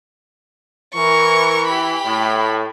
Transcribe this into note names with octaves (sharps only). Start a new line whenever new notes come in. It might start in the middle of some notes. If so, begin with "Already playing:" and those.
E3 A#4 C#6
G4 B5
A2